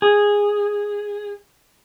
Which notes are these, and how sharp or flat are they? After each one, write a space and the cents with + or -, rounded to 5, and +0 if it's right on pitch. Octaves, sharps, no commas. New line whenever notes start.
G#4 -10